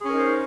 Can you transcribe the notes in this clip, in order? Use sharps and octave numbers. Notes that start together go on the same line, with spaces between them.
C#4 D#4 G#4 A#4 C5